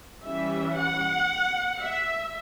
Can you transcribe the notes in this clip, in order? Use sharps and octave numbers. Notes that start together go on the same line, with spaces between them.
E3 G3 C#4 E5
F#5
E5